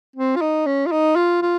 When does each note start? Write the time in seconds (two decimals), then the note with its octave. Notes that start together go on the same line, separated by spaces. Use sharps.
0.16 C4
0.36 F4
0.41 D#4
0.66 C#4
0.86 F4
0.92 D#4
1.16 F4
1.42 F4